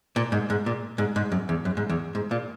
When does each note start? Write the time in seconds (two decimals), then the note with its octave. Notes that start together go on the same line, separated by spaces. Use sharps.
0.16 A#2
0.32 G#2
0.50 G#2
0.66 A#2
0.98 G#2
1.16 G#2
1.32 F#2
1.49 E2
1.65 F#2
1.77 G#2
1.89 E2
2.15 G#2
2.31 A#2